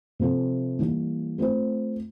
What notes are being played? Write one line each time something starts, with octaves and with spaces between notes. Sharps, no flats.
C3 F3 C4 F4 A4
E3 G3 A#3
A3 C4 F4 C5